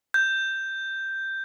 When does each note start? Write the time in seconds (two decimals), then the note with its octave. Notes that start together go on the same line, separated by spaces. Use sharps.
0.14 G6